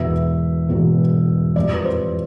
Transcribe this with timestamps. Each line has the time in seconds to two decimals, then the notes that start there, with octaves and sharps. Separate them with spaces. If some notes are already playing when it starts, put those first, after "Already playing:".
Already playing: E1 E2 B2 B3 E5
0.69 E1 E2 B2 B3
1.56 F2 E3 G3 D5
1.74 B4
1.85 C5